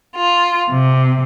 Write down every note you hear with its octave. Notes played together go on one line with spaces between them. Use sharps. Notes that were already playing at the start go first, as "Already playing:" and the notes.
F4
C3